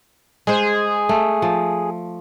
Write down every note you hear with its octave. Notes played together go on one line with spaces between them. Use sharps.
G#3 G#4 C5
A3
F3